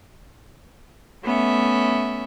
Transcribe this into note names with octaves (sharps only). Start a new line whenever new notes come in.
A3 B3 C#4 E5